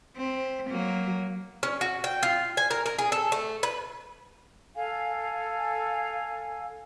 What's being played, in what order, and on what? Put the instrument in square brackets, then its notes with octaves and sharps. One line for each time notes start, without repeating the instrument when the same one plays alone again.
[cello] C4
F#3 A#3
[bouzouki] C#4
F#4
G5
F4
G#5
A#4
A#4
G#4
A4
A3
B4
[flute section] A4 F5 G#5